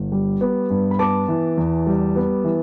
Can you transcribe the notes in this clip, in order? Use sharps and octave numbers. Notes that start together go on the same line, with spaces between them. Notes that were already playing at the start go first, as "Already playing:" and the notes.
Already playing: G1
G3
B3
G2
B5
B3 A5 D6
E3
E2
G3
B3
E3